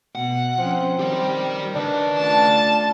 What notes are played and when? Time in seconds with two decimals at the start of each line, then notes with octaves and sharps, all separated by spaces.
0.15 B2 F#5
0.59 F3 C4 C#4
0.99 D#3 G4 D5
1.75 C#3 D4 B4
2.18 A3 C#4 F4 A5